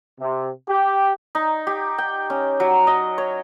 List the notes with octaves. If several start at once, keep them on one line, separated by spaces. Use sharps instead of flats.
C3
G4
D#4
G4
G5
C#4
F#3
D#5
C#5